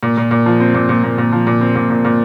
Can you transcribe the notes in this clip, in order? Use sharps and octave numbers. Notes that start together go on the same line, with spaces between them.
A#2
A#2
A#2
F3
C4
A#2
A#2
A#2
A#2
F3
A#2
C4
A#2
A#2
A#2